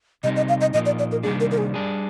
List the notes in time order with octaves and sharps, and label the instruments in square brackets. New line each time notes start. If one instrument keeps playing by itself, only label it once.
[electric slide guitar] C3 G3 C4 D#4 [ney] D#5
[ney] D#5
F5
D#5
[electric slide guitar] A#2 F3 A#3 D#4 [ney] D#5
[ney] D5
D5
A#4
[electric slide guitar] C3 D#3 G3 A#3 D4 [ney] G#4
[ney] A#4
A#4
G#4
[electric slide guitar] G3 D4 G#4